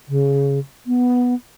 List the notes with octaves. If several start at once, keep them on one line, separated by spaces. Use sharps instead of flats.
C#3
B3